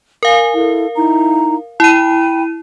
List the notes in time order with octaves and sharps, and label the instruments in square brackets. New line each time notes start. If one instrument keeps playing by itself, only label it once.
[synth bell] A#4 F5 [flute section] G#5
[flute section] E4 A4
D#4 E4 A#5
[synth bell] E4 D#7 [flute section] G5 B5